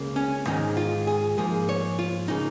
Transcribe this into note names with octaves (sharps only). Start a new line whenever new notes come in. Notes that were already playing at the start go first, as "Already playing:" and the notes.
Already playing: C#2 C#3 A#3
C#4
G#2 D#3 G#3 D#4
F4
G#4
G#2 F3 A#3 G#4
C#5
F4
C#3 A#3 D#4